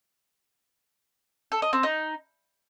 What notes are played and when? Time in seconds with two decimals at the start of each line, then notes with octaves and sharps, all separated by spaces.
1.52 A4
1.62 D#5
1.73 C4
1.83 D#4